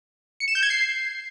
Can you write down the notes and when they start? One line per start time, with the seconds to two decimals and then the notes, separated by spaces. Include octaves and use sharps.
0.40 C#7
0.48 E7
0.55 G6
0.63 G#6
0.70 C7